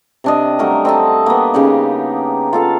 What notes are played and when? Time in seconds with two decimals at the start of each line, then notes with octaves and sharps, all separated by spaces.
0.24 C3 D4 D#5
0.59 F#3 G3 A3 A#4
0.85 C4 D#5 A5
1.26 A#3 B3
1.54 C#3 D#4 G4 F#5
2.53 F4 A4 F5